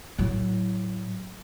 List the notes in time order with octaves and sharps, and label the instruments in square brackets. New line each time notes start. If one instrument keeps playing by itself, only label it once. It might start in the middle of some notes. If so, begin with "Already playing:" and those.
[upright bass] A2 F#3